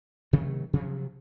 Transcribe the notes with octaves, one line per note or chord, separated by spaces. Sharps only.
C3 D#3 F#3 A3
C3 F3 F#3